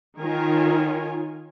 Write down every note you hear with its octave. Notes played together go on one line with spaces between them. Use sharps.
D#3 F4 A#4 C#5 G#5